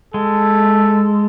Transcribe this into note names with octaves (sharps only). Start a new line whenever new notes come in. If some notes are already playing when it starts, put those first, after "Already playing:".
G#3 A4